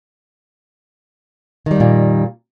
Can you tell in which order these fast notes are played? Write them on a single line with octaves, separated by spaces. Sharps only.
D#3 G3 F2 A#2